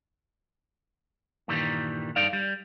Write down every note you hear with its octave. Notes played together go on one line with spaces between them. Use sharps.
G2 A#2 D#3 E3 G3
G2 D#4 A4 D5 F5
G3